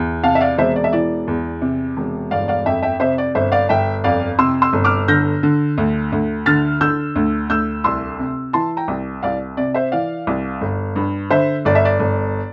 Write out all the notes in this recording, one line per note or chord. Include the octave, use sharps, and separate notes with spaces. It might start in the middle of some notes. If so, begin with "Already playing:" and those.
Already playing: E2
C3 F5 A5
E5
D5 F5
E1 C5 E5
D5
E5
E3 D5
E2
C3
E1
G1 D5 F5
D5 F5
F2 E5 G5
E5 G5
C3 C5 E5
D5
G1 C5 E5
D5 F5
G1 E5 G5
F2 D5 F5
C3 C6 E6
C6 E6
G1
D6 F6
D3 G6 A#6
D3
D2
D2
D3 F6 A6
D3 E6 G6
D2
D2 E6 G6
C2 C6 E6
C3
E3 A5 C6
G5 A#5
C2
C2 D5 F5
C3 D5
C5 E5
E3 D5 F5
C2
G1
G2
D3 C5 E5
G1 D5
E5
D5
G1